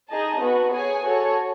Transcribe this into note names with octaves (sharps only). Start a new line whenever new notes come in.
D#4 G#4 D#5 A5
B3 F#4 B4
G#4 C#5 G#5
F#4 A4 C#5